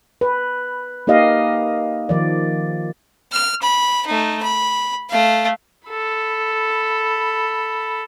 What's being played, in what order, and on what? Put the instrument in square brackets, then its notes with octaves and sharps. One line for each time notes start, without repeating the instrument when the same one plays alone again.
[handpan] B4
A#3 D#4 G4 D#5 F5
D#3 F3 D5
[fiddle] F6
B5
A3 D#4
B5
A3 F5
[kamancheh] A4 B5